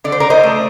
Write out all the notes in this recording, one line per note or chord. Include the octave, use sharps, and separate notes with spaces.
D3 D5
C5
A#4 D5
C5 D#5
A3